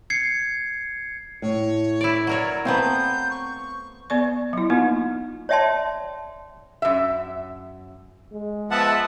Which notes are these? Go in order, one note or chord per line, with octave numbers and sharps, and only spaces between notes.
G#6 C7 C#7
A2 C#5
E4 D5
F#3 A#4 C#5 D5
F3 A3 B3 C4 A#5 G6
C#6
B3 D5 C#6
F#3 E4
A#3 B3 D#4 F4
C#5 D5 E5 G5 A5 C6
F#2 E5
G#3
F3 B3 E5 F#5 A5